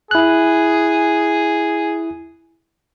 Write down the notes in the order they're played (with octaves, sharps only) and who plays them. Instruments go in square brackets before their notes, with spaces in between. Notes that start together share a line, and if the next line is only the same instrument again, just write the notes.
[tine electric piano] E4 F#6 [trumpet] G#4